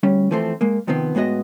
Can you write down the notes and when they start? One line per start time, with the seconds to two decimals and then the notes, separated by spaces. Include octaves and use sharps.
0.03 D2 G3 C#4
0.31 E3 F3 A3 C4 C5
0.61 G#3 A#3
0.87 C3 D#3 F3 B3 C4
1.15 A2 G#3 B3 F#4 D#5